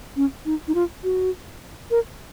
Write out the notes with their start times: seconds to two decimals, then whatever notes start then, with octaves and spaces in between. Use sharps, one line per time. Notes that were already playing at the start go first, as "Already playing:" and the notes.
0.16 C#4
0.46 D#4
0.68 D#4
0.75 F4
1.04 F#4
1.91 A#4